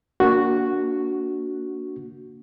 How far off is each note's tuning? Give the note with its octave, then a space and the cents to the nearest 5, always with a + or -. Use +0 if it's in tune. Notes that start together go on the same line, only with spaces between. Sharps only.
A#3 +0 D4 -15 F#4 +0